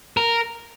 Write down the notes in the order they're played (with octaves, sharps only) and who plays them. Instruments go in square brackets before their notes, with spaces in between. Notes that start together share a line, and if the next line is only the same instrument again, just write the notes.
[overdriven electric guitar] A#4